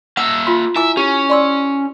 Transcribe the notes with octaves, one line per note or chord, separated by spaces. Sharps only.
A#3 E5 F#5
F4 C6
E4 E5 G#5 D6
C#4 G4
D5 C6 E6